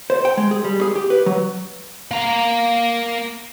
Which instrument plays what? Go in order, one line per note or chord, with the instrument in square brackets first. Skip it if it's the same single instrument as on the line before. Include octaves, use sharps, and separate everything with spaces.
[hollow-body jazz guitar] C5
G5
G#3
G#4
G3
G#4
G4
B4
F#3
[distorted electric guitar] A#3 A#5